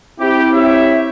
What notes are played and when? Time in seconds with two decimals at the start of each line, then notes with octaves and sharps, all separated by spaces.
0.20 C4 E4 G4
0.53 G4 C#5 E5